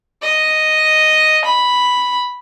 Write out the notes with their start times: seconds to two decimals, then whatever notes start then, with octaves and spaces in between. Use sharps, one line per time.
0.22 D#5
1.44 B5